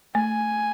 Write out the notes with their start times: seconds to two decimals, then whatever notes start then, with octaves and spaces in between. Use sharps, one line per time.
0.15 A3 G#5